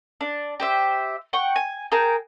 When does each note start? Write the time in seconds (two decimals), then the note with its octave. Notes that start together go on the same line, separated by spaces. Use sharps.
0.21 D4
0.60 G4 C5 E5
1.33 F#5 G5 C#6
1.56 G#5
1.92 G#4 A#4 G5 A5